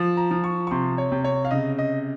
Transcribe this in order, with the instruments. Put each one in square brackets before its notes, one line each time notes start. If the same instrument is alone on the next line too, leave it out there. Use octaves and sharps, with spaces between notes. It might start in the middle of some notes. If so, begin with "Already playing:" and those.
Already playing: [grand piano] F3
A#5
F3
C#6
C#6
C3 C6
C#5
C3
C#5
F5
C#3 D#5
D#5